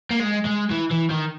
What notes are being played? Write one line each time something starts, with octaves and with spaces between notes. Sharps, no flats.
A#3
G#3
G#3
E3
E3
D#3